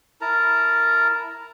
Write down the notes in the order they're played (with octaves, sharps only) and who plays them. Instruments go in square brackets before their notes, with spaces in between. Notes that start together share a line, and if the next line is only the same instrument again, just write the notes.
[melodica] E4 A#4 A5 A#5